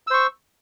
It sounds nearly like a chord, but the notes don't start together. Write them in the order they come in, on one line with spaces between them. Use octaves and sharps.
E6 C5 C#6